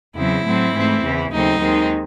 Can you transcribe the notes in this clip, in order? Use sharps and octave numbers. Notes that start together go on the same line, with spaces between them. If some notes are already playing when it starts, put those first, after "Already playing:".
E2 C#3 F#3 C4 E4
A2 F#3 A3 C4
G#2 E3 A3 C4
E2 C#3 E3
D#2 C#3 F#3 A3 C4 D#4
D#2 D#3 G#3 C4